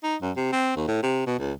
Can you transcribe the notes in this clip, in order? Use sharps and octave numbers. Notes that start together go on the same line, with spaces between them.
D#4
F#2
C3
C4
D#2
A2
C3
B2
C#2